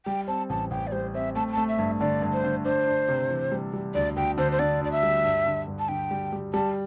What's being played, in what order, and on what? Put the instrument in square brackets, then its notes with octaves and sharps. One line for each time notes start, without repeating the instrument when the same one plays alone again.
[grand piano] G3 [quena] G5
[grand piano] C4 [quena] A5
[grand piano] A1 [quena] A5
[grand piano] A1 [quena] G5
[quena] D5
[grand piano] G3 [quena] C5
[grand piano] C4 [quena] E5
[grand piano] A3 [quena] A5
[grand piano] A3 [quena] A5
[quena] E5
[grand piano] G2
[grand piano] D3 [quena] D5
[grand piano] G2
[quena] C5
[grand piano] D3
[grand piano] D4 [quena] C5
[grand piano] D4
C3
E3
G3
G3
[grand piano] D2 [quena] D5
[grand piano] D2 [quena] G5
[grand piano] D3 [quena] C5
[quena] C5
[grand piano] D3 [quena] D5
[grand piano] D2 [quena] D5
[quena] E5
[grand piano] G3
G2
D3
G2
[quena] A5
[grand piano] D3 [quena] G5
[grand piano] G3
G3
[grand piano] G3 [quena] A5